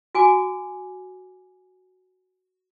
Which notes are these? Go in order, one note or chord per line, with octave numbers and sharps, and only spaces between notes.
F#4 G#5 D6